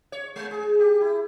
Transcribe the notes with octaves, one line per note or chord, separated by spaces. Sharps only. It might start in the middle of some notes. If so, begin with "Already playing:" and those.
C#5
G#3
G#4
G4
E4